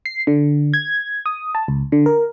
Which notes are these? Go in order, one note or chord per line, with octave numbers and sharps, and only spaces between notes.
C7
D3
G#6
D#6
A5
C#2
D3
A#4